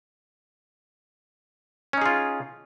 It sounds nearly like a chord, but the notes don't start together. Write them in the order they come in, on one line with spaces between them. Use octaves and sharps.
C#4 D#4 G#4 F4